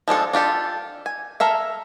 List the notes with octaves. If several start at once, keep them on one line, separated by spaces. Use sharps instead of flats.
F3 G#3 D4 A4
D4 F4 G4 A4
G#5
A4 A#4 E5 F5